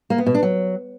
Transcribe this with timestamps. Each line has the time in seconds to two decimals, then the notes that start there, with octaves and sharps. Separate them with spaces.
0.10 A#3
0.18 B3
0.26 B2
0.35 D4
0.43 F#3